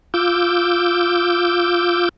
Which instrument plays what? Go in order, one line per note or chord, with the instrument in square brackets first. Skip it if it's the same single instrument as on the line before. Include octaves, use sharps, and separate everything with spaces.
[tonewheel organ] F4 D6 E6 G6